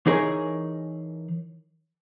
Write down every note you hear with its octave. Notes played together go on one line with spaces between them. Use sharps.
E3 D#4 G#4 A#4 C#5